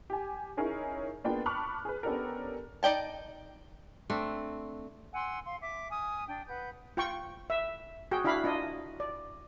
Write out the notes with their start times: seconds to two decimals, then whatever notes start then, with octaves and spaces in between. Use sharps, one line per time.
0.10 G4 G#5
0.57 C#4 D#4 E4 G#4 A#4 C#5
1.24 A#3 B3 D4 F4 G#4 G5
1.46 A5 B5 C#6 D6 F6 F#6
1.85 G#4 B4
2.03 B3 C#4 D4 G4 A4 A#4
2.83 D#4 D5 G5 A5
4.10 A3 C4 D4
5.13 F#5 G#5 C6 E6
5.45 F5 C6
5.61 E5 D6
5.90 G#5 D#6 F6
6.27 D4 G5
6.48 B4 F#5 G6
6.97 F4 G5 C#6
7.50 E5
8.11 F#4 G#4 G5
8.24 D4 E4 F#4 F5 B5
8.44 D4 F4 D#5
9.00 D5